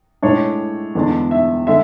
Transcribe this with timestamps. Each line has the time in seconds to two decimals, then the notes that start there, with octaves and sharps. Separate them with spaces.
0.22 A2 G#3 D4 C#5
0.95 E2 D3 G#3 D4
1.31 E5
1.67 D3 G#3 E5